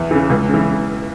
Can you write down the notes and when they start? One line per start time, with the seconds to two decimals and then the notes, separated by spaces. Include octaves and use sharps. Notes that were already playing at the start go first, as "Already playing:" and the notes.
Already playing: E2
0.11 C#3 E3
0.30 C#2
0.49 C#3
0.54 E3